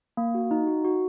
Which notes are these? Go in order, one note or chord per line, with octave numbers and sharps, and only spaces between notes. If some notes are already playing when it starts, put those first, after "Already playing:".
A#3
F#4
D#4
F#4
F#4